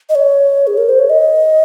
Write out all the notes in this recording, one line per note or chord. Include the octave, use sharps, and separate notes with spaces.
D#5
C#5
G#4
A#4
C5
C#5
D#5